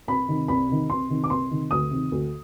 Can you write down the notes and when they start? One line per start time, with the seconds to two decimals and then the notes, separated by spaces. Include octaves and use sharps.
0.08 C2 B5
0.28 C3 D#3
0.48 C2 B5
0.69 C3 D#3
0.90 C2 C6
1.10 C3 D#3
1.24 D6
1.30 C2 C6
1.50 C3 D#3
1.71 D2 D#6
1.91 C3 D#3
2.12 D2